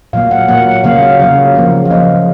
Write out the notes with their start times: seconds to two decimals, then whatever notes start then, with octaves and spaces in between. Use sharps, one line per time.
0.13 A#2 F#3 A#3 F5
0.31 F#5
0.48 A#2 F#3 A#3 F#5
0.84 C#3 F#3 A#3 F5
1.19 C#3 F#3 A#3
1.55 C#3 F3 A#3
1.85 F5
1.91 C#3 F3 A#3 D#5